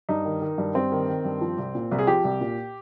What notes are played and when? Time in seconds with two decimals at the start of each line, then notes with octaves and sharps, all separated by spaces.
0.09 G2 D#4
0.25 D#3
0.42 D#3
0.58 G2
0.75 G2 C4
0.92 D#3
1.08 D#3
1.25 G2
1.41 F3
1.58 C2
1.75 A#2
1.92 C2
1.99 G#4
2.07 F3 G4
2.24 C2
2.41 A#2